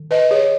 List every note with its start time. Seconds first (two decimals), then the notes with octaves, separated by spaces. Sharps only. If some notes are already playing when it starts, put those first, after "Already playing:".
Already playing: D#3
0.11 B4 D#5
0.31 G#4 C#5